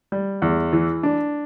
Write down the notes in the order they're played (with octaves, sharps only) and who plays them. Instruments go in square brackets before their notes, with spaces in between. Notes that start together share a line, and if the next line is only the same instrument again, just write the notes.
[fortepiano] G3
E2
E3
D4